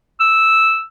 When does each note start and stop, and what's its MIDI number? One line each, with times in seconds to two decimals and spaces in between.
0.20 0.83 88